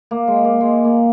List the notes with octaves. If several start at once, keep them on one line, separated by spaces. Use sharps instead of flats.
A#3
G#3
A#3
G#3
A#3